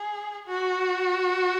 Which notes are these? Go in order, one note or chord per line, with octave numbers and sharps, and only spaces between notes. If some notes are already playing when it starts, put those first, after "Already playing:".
Already playing: G#4
F#4